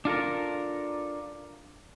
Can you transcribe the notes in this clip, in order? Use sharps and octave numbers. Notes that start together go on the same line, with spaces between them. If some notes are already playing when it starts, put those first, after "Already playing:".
D4 F4 A4 A#4